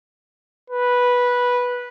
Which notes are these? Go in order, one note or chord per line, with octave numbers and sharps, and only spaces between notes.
B4